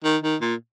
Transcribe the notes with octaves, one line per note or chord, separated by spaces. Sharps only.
D#3
D#3
A#2